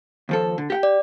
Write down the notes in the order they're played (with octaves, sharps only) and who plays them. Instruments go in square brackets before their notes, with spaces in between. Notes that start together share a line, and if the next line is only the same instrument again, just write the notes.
[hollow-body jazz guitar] D#2 F3 A4
D3
G4 F#5 G5
[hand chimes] D5